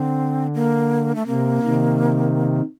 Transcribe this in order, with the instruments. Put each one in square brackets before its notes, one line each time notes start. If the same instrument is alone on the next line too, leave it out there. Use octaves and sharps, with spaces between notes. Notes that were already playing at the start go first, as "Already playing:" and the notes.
Already playing: [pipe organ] D3 [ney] C4
[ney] A#3
A3
[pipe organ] C3 [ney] A#3
[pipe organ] C3 D#3